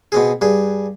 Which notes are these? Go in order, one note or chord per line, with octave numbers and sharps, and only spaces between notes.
B2 C4 G#4
G2 G#4